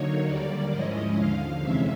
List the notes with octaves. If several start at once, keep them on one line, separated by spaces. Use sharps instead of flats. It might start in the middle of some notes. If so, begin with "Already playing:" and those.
Already playing: D3 F#3 A#3 D#4 C#5
D#2 D3 G3 A#3 D5
G#2 F3 G#3 C#4 E4 D#5
D#2 D3 F3 F5
F2 C3 E3 G#3 C#4 E5